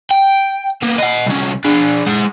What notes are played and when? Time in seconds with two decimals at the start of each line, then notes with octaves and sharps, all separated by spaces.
0.10 G5
0.82 A#3 B3
0.98 D#5 F#5
1.26 C2 C#4
1.64 D4 G#4
2.07 G#3 F#5